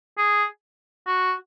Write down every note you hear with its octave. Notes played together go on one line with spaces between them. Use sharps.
G#4
F#4